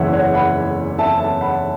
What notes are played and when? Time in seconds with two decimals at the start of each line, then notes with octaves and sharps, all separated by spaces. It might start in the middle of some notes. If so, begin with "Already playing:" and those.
Already playing: F#1 E2 E3 C#4 E4 C#5 E5 F#5
0.13 C#5 F#5
0.34 F#5 B5
0.98 E5 A5
1.19 E5 A5
1.41 F#5 B5